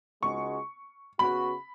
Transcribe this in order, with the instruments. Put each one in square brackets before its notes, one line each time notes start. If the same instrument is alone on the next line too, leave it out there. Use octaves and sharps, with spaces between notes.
[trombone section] C#2 C#3 G#3 D#4 F#4 [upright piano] C#6
[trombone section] C#3 B3 F#4 [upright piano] B5